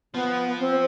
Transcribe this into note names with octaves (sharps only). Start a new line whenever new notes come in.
F3 B3
C4